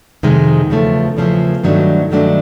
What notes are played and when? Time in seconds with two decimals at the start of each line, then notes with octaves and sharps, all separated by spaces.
0.23 F2 C3 D#3 G#3
0.70 E2 C#3 F3 A3
1.17 E2 C#3 F3 A3
1.64 G2 D#3 F#3 A3 D4
2.11 G2 D#3 F#3 A3 D4